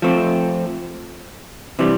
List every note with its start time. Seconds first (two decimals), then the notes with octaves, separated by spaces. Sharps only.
0.02 F3 A3 C4
1.79 C3 E3 G3